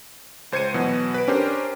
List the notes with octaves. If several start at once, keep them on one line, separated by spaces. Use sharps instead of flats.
C#2 C5 G#6 C#7 D#7
B2 E3 F#3
B4 D7
C#4 D4 G4 A#4 C5